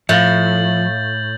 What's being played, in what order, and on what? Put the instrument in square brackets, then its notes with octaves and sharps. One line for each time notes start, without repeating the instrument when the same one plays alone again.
[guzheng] A2 [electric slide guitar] F3 [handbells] E5 F5 [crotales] G6 A6 F#7